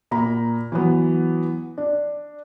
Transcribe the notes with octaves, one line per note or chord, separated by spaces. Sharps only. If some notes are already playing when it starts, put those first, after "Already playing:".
A#2 A#5 B5
E3 F#3 B3
D4